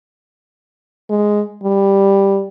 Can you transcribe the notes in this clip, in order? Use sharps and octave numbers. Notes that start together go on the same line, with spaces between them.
G#3
G3